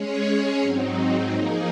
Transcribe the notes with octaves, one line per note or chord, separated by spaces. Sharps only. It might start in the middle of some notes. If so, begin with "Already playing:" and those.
Already playing: G#3 C#4 G#4 C#5
G#2 F#3 C4 D#4
F3 A#3 D#4 G#4